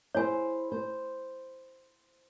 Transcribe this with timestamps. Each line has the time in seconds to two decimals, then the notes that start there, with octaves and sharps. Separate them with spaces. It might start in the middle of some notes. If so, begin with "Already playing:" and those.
0.15 E4 G#4 C5 C#5 G#5
0.72 C5